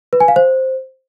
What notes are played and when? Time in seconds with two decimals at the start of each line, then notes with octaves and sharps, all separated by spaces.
0.13 B4
0.20 G#5
0.28 F5
0.36 C5